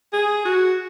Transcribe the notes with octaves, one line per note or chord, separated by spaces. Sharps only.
G#4
F#4